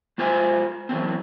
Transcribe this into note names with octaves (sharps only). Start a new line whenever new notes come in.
G#3 F4 C5 G#5
E3 F#3 C4